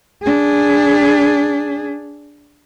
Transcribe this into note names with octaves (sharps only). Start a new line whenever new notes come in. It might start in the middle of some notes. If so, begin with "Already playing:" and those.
D4 G#4